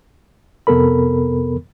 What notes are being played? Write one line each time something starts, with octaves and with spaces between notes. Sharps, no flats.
F2 C3 B3 A4 A#4 B5